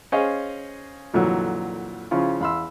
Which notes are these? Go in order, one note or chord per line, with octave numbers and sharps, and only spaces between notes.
C#4 G#4 C5 C#5 D#5 F5
F2 A#2 D3 E3 F#3
C#3 F3 C#4 E4 F4
E2 F5 B5 C6 E6